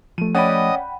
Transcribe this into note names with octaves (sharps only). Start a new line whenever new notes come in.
F3 A3 D#7
C#4 D5 D#5 F#5 G5 B5 D#7